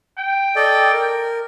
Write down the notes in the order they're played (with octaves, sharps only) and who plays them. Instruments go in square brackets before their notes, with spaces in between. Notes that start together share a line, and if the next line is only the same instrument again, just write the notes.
[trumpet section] G5
[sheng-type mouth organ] A4 D5 D#5
A#4